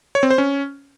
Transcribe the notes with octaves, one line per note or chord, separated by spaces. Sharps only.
C#5
C4
C5
C#4